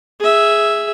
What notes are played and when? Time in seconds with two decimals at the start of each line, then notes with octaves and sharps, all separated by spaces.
0.20 G#4 E5